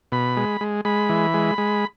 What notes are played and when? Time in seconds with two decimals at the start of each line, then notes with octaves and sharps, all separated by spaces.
0.12 B2 B5
0.37 G#3
0.61 G#3
0.85 G#3 B5
1.09 E3
1.34 G#3
1.58 G#3